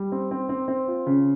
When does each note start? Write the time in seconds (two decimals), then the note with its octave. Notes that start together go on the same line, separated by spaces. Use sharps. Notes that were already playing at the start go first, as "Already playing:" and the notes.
Already playing: G3
0.12 C4
0.31 C4
0.49 C4
0.68 C4
0.88 F4
1.07 C#3